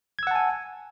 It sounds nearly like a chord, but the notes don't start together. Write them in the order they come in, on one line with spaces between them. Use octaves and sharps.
G#6 E6 F#5 A5 G#5